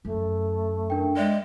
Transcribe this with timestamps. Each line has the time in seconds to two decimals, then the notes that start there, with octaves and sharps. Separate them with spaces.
0.05 F#2 A3
0.90 D4 A#4 G5
1.17 G#3 D5 E5